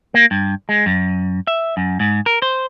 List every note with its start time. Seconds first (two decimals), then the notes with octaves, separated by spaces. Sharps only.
0.14 A#3
0.31 G2
0.69 G#3
0.86 F#2
1.47 E5
1.77 F#2
2.00 G#2
2.26 A#4
2.42 C5